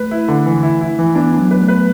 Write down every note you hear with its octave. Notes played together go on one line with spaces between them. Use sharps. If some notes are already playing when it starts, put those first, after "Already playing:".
Already playing: A3 B4
E4
D3
E3
E4
E4
E3
B3 D4
D4
F#3
B4
A3
B4